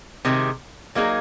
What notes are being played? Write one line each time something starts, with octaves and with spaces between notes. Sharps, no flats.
C3 D#3 G#3
F#3 A#3 D#4 G#4